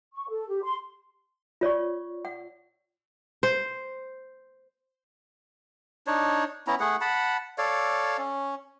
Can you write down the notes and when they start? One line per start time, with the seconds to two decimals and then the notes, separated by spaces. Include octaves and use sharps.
0.13 C#6
0.29 A4
0.48 G4
0.63 C6
1.61 F4 C#5 D5 C#6
2.25 F#5
3.43 C5
6.07 D4 D#4 C#5
6.67 B3 C#4 E4 A#5
6.80 A3 G#4 F#5
7.01 F#5 A5 B5
7.58 A4 C#5 D5 F5
8.18 C#4